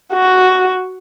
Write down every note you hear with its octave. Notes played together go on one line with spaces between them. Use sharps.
F#4